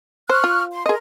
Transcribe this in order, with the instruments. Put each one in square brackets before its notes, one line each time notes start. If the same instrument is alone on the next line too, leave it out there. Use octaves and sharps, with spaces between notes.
[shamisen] C5 [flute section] C#6 F6 F#6
[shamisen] F4
[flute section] C6
[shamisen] G#4 D#5 [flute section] A#4 C6